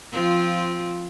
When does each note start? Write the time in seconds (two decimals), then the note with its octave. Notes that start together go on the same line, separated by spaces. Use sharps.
0.12 F3 C4 F4